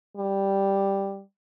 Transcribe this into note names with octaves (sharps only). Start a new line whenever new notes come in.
G3